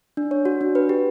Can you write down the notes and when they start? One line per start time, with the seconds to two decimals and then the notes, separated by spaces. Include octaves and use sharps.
0.17 D4
0.31 C#5
0.45 F#4
0.61 D4
0.75 B4
0.89 G4